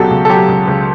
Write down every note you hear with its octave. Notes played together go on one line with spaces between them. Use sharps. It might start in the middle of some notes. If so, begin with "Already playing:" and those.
Already playing: C#2 B2 F#3 F#4 G4 A4
C#2
A4
F#3 G4
C#2
C#2